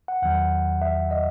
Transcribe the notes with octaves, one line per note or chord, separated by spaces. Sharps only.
F#5
E2 D#3 F#3 F#5
E5
D#5